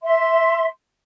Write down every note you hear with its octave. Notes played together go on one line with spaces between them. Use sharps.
E5 C6